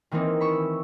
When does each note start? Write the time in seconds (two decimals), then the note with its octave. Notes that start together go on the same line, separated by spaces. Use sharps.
0.11 D#3 E3 A#3 C4 D#4 E4
0.41 B5 C#6 E6